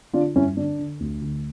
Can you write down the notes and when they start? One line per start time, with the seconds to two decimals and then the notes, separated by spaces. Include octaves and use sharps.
0.14 D3 D4 F4
0.36 G2 C#4 E4
0.57 D3 D4
0.79 D3
1.00 D2
1.22 D3